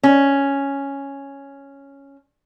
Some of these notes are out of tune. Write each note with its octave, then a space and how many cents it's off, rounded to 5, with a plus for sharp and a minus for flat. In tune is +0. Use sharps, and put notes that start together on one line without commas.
C#4 +0